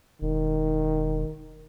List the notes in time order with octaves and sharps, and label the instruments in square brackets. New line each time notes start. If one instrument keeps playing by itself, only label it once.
[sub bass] E1 [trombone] D#3